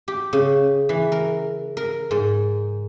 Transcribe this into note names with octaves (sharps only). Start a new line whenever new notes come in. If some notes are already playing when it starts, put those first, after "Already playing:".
G4
C#3
E3
A#4
A#4
G#2